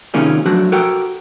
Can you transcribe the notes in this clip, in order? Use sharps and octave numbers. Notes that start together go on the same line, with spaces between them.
C3 D#3 A#3 C#4 F4 G#4
F3 F#3 A3 D4 F#4
F#4 A4 A#4 G5